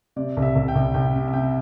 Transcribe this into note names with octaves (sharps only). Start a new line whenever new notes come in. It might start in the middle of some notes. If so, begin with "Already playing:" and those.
C3 D5
C2
E5
C2
G5
C2
C2 G5
C3
E5
C3 G5